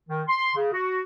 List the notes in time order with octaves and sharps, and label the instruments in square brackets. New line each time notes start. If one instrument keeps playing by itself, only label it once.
[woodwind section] D#3
C6
C#3
F#4